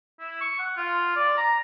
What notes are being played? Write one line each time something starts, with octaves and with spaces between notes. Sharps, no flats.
E4
C#6
F#5
F4
D5
A#5